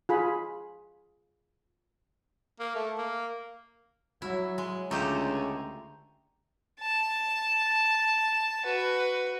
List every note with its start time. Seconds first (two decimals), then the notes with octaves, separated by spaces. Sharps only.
0.09 F4 G#4 B5
2.60 A#3
2.75 A3
2.98 A#3
4.22 F#3 E4
4.58 G#3
4.91 C#2 D3 A3 G4 C5 A#5
6.80 A5
8.66 F#4 B4